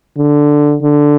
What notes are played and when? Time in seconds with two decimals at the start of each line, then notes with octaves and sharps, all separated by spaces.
0.17 D3
0.82 D3